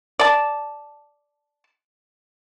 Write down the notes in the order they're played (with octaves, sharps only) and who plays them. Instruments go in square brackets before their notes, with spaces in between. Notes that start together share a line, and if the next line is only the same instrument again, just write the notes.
[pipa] D5 A5